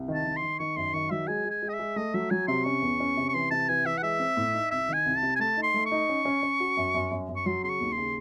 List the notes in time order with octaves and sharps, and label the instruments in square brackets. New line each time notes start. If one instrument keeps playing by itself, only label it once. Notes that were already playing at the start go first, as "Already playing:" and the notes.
Already playing: [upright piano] C2
D#3
[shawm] A5
[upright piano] D#3
[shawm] C6
[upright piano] D#3
[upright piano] D#3 [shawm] C#6
[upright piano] F#2 [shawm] C6
[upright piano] D#3 [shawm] C#6
[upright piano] F#3 [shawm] E5
[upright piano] G#3 [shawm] G#5
[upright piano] G#3
[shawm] G#5
[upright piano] G#3
[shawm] D#5
E5
[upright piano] G#3
[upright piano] A3 [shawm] D#5
[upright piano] F#3 [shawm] E5
[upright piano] F#3 [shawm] G#5
[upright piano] C3 [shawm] C6
[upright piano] C#4 [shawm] C#6
[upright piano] E2
C#4
C3
[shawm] C#6
[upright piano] E3 [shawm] C6
[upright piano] C3 [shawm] A5
[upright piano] E3 [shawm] G#5
[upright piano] E3 [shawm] E5
[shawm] F#5
[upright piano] G#3 [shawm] E5
[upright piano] C4
A2
D#4
[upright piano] C2 [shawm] E5
[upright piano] D#3
[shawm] G#5
[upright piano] C2
[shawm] A5
[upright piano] C3
[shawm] G#5
[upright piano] A3 [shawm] A5
[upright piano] D#4
[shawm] C6
[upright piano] A3
[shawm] C#6
[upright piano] D#4
C#4
C#4
C#4
F#4
F#2
F#2
F#2
F#2
[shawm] C#6
[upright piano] F#3 [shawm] C6
[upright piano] C#3 [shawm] C6
[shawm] C#6
[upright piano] D#2
[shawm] C6
[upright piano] C#3